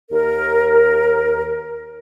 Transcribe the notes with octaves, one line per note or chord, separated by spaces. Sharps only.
D#2 A#4